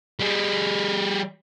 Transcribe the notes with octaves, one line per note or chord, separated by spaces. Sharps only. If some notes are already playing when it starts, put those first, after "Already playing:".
G3 G#4